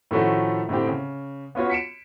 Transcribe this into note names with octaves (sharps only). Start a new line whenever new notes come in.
A2 D#3 F3 A3 C#4 F#4
A2 D3 C4 G4
C#3
B3 C#4 F4 F#4 C#5
B6 C#7 D7 E7